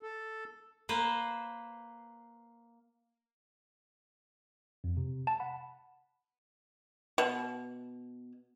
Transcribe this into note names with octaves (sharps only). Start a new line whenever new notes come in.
A4
A#3 B4 C5
F2
C3
A5
F#5 B5
B2